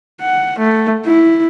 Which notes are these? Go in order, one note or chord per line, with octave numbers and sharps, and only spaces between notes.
F#5
A3
E4